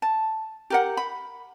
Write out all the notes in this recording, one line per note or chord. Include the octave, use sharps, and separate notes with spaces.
A5
G4 A#4 F#5
B5